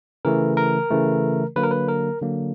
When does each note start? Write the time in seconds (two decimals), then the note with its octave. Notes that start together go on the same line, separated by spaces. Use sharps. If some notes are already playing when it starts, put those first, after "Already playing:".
0.25 C#3 E3 A3 A#4
0.57 A#4
0.90 C#3 E3 A3
1.56 D3 F#3 A#3 B4
1.63 A#4
1.71 B4
1.88 A#4
2.21 D3 F#3 A#3